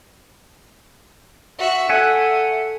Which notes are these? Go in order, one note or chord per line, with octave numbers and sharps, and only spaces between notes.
F#4 E5
A3 E5 F#5 G#5